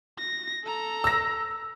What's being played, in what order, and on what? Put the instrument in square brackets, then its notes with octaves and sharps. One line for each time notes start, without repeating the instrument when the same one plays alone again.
[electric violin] A#6
A4 A#5
[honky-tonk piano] E6 A#6